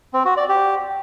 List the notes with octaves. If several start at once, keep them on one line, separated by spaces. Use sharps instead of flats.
C4
F#4
D5
G4